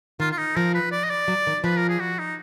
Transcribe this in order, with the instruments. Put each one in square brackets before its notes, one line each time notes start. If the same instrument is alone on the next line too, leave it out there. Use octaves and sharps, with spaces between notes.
[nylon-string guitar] D#3 [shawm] F4
[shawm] F4
D#4
[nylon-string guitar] F3 [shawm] A#4
[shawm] B4
D5
D#5
D5
[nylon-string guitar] F#3
D#3
[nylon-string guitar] F3 [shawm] B4
[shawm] A#4
G#4
F#4
D#4